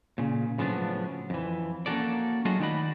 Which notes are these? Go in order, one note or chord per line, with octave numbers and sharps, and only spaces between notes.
A#2 C#3
A2 C#3 F3 F#3 B3 D4
F2 E3
A#3 C#4 D4 F#4 A4 D5
F#3 A3 F4 F#4 G#4 D#5
D#3 D#4 F#4 D5 B5